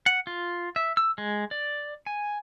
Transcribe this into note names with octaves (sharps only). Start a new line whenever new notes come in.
F#5
F4
E5
E6
G#3
D5
G#5